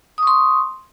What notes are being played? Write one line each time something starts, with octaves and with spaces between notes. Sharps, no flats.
C6 C#6 D#6